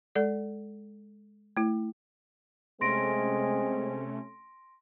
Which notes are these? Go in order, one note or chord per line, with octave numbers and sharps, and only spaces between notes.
G#3 A4 D5
A3 E4
C3 G#3 A3 C4 C#4 C6 A#6 D7